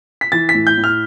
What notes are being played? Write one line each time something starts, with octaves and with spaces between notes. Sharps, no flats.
B6
E3 A6
B6
A2
G6
A2
F6